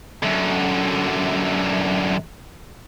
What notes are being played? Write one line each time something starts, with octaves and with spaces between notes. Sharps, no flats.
F#2 D3